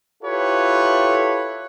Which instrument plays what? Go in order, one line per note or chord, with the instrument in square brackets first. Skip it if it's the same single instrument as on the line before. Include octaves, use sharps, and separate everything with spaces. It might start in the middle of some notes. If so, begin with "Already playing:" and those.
[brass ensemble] E4 F4 G4 A4 B4 C#5